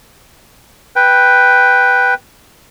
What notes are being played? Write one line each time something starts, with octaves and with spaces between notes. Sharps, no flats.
B4 G5